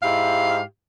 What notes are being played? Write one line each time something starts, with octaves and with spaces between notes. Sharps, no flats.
G#2 E4 G4 F5